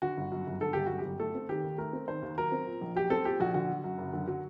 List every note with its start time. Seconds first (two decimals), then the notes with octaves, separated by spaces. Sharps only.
0.02 D3 F#4
0.17 G1
0.32 F#2
0.47 G1
0.61 D3 A4
0.73 G1 G4
0.86 F#2 F#4
0.99 G4
1.05 G1
1.20 A3 A4
1.35 C4
1.49 D#3 G4
1.64 D#2
1.78 A3 A#4
1.93 C4
2.08 D#3 C5
2.22 D#2
2.38 F#3 A#4
2.52 C4
2.67 A#2
2.81 A#1
2.96 F#3 G4
3.10 C4 A4
3.25 A#2 G4
3.40 A#1 F#4
3.54 D3 F#4
3.70 F#3
3.84 F#2
3.98 F#1
4.13 D3
4.27 F#3